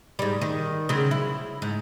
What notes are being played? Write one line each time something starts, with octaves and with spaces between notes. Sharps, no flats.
G#2 G3
D#3
C#3 F#3 C4
E4
G#2